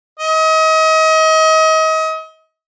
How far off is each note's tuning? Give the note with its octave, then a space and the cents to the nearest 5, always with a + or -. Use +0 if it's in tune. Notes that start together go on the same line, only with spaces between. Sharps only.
D#5 +35